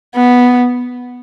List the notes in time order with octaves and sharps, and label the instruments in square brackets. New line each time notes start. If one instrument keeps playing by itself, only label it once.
[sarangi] B3